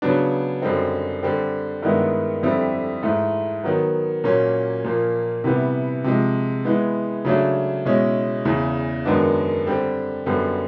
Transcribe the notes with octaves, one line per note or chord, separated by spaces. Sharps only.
C#3 F#3 B3 D4
F#2 D3 G3 C4 D#4
D3 G3 C4
G2 D#3 G#3 B3 E4
F2 D3 G3 C4 E4
G#2 E3 A3
D#3 F#3 B3
A#2 F#3 A#3 C#4
A#2 F3 A#3
C3 E3 G3 B3
C3 F3 G#3
E3 G#3 B3
C#3 F#3 A3 D4
B2 G#3 C#4 E4
E2 C#3 E3
F#2 D#3 G#3 B3 D4
D3 G3 C4
F#2 D3 G3 B3